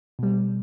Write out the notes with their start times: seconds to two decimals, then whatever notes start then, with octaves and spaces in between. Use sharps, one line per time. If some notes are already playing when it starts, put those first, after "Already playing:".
0.19 B2 G3